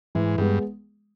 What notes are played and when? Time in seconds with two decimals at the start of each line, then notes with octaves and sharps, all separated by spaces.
0.15 G#2 E3
0.38 G2 G#3 B3